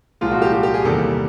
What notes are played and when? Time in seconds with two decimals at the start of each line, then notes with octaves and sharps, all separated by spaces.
0.21 C2 A#2 F3 G#3 F4
0.31 F#4
0.42 G4
0.52 G4
0.63 G4
0.74 G#4
0.85 E2 C3 D#3 G3 A#3 A4